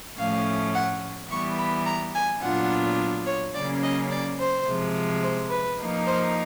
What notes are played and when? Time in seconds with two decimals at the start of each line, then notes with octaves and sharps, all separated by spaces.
0.18 A2 F3 A3 C#4 F5
0.74 F#5
1.30 E3 G3 B3 C#6
1.58 B5
1.86 A#5
2.15 G#5
2.42 A#2 F#3 B3 D4 F4 F#5
3.26 C#5
3.54 C#3 F#3 A#3 C#4 D5
3.82 D#5
4.11 D5
4.39 C5
4.67 C3 F3 G#3
5.23 C5
5.50 B4
5.78 F3 A#3 D#4
6.07 C5